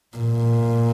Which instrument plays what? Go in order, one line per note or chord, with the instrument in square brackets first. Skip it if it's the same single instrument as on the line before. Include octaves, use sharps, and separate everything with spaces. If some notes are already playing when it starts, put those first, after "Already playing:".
[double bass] A#2